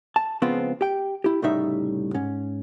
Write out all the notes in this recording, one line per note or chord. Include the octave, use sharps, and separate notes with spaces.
A5
C#3 F3 G#3 B3 C4 F4
G4 G5
E4 G4
C2 A2 C#3 G3 D#4 E5
G#2 C#4